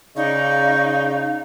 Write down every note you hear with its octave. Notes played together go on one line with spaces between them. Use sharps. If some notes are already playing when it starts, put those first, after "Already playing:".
C#3 D#4 D5 D#5 F5 C#6